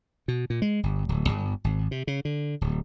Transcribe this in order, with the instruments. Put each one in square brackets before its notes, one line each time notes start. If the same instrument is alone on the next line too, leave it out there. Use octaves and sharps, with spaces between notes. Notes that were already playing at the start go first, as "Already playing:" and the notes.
[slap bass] B2
A#2
G#3
G1
D1
G1
G#1
C3
C#3
D3
D1